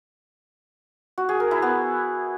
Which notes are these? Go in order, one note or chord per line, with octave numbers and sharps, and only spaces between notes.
F#4
G#4
A#4
E4
B3